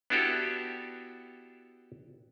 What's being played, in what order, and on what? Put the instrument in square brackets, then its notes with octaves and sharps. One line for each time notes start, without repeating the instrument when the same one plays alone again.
[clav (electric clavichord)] B3 D4 E4 F#4 G4 A4